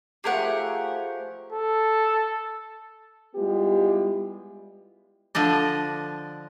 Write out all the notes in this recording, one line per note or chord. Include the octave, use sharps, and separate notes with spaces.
F3 A3 G4 G#4 A#4 F#5
A4
G3 G#3 B3 E4 F4 G4
D3 F3 D4 D#5